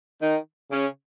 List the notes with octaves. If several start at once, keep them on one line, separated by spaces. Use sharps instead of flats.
D#3 D#4
C#3 C#4